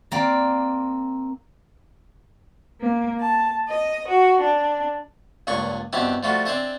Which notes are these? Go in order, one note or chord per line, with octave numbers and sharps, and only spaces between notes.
A#3 C4 D5
A#3
A5
D#5
F#4
D4
C#2 G2 A#2 G#4 C#6
G2 B2 C4 E4 G4
F3 G3 A3 F4 F#4
C4 D4 G#4 C5 D#5 E5